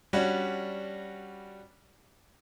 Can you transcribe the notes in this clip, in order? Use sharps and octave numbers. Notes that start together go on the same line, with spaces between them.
G3 C#4 D4 F#4